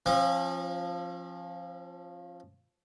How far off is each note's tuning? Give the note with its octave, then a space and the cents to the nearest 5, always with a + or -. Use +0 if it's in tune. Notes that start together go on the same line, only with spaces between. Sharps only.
F3 +0 C#4 -45